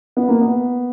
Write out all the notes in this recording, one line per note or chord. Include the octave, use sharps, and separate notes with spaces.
B3
A#3
B3